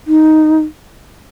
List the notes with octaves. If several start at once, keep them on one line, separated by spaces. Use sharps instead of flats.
D#4